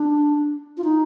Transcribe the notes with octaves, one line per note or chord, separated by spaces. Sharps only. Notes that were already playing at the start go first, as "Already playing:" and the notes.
Already playing: D4
F4
D#4